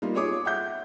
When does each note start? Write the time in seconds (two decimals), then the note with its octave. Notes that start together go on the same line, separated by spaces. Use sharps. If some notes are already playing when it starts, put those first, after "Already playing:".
0.02 G3 A#3 D#4 F4
0.14 F4 G#4 C#5 D6 D#6
0.45 E5 F#5 G6